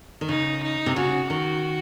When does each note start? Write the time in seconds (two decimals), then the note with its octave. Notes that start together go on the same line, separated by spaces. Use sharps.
0.21 D#3
0.29 C#3 D#4
0.63 D#4
0.86 C3
0.96 C#3 F#4
1.30 D#3 F#4